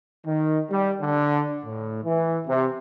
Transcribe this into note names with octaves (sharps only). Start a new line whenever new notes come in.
D#3
G3
D3
A2
E3
C3